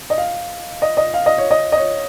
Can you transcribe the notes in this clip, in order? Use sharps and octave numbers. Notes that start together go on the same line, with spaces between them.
D#5
F5
D#5
D#5
F5
D#5
C#5
D#5
D#5
C#5